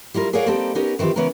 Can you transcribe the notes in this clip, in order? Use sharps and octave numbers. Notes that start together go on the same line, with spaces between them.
G3 E4 F4 A#4
G#4 A#4 C#5 D5 F5 F#5
G3 A#3 C4 D#4 G4 A4
B3 C#4 D#4 G4 A#4
D#3 E3 C4 F4 G4
C#3 E3 B3 C#4 E4 A#4